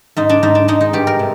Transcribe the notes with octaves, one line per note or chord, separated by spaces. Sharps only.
G#2 D#4
D4
G#2 D#4
D4
G#3 D#4
D#4
G2 G4
A#4
C3